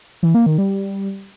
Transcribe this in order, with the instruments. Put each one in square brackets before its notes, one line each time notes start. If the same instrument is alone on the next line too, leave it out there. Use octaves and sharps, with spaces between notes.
[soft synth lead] E3
A#3
D#3
G3